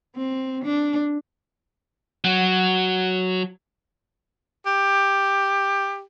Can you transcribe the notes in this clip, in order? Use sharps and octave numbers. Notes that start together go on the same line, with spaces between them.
C4
D4
F#3
G4